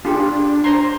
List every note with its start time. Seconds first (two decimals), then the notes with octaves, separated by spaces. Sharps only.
0.05 D4 F4 G4 G#4
0.64 C5 A#5 C6